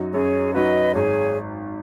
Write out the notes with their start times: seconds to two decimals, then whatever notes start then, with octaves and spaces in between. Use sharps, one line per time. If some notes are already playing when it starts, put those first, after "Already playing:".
Already playing: F#2 F#3 D#4 F#4
0.13 F#2 G#4 C#5
0.54 F#3 D#4 F#4 B4 D#5
0.94 G#1 G#4 C#5